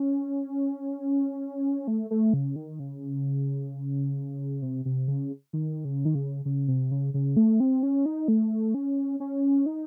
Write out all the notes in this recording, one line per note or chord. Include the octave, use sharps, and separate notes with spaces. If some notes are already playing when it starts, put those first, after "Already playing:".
Already playing: C#4
A3
A3
C#3
D#3
C#3
C3
C3
C#3
D#3
C#3
D#3
C#3
C#3
C3
C#3
C#3
A3
C4
C#4
D#4
A3
C#4
C#4
D#4